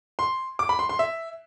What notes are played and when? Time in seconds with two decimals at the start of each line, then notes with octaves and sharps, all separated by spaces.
0.19 C6
0.59 D6
0.69 B5
0.79 C6
0.89 C6
0.99 E5